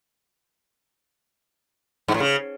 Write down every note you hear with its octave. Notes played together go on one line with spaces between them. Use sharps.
G#2
A2
C#3